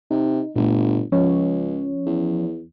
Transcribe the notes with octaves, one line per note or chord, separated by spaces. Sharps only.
C3 D#4
G1 A#2 A3
C#2 F3 C#4 C#5
E2